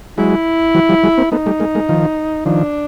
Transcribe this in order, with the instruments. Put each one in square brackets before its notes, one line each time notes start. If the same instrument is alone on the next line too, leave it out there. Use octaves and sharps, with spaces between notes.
[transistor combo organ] F#3 G#3 [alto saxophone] E4
[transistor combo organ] E3 F#3
F3 G3
F#3 G#3
A#3 C4
[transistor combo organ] A3 B3 [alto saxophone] D#4
[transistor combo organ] G3 A3
G#3 A#3
G#3 A#3
D#3 F3
[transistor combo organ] D#3 F3 [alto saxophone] D4